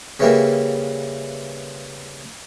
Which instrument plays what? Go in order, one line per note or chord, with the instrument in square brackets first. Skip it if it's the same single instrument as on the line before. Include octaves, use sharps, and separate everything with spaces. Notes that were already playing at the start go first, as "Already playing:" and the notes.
[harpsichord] C#3 E3 G3 A#3